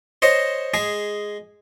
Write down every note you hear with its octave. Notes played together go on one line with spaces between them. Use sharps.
C5 C#5 D#5
G#3 G#4